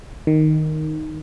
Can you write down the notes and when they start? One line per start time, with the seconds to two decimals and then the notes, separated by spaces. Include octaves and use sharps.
0.27 D#3